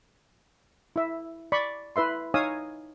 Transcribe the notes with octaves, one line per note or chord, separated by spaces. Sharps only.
E4 E5
D5 B5 C#6
E4 B4 E5 C6
D#4 C#5 F5 G#5 D#6 E6